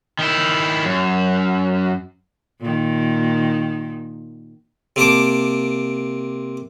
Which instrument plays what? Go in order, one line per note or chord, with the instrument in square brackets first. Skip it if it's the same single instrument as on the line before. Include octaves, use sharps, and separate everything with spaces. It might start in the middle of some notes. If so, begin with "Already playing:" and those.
[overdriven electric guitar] D#3 E4
F#2
[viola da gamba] A#2 D#3
[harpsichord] C3 A#3 A5 D6